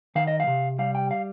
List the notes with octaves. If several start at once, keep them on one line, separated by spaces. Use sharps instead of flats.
D#3 F5
D#5
F5
C3
G3 F5
G5
F5